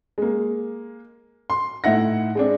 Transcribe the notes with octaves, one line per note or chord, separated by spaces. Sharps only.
G#3 A#3
C6
A2 D#4 E4 E5 F#5 A#6
G#3 C4 D4